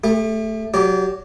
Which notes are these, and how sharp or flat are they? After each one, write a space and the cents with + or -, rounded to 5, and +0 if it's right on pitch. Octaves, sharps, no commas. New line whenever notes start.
A3 +0 G4 +45
F#3 +0 G4 +0 D5 -35